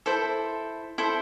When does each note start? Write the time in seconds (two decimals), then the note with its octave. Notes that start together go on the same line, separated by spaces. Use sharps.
0.06 E4 A4 C5
0.98 E4 A4 C5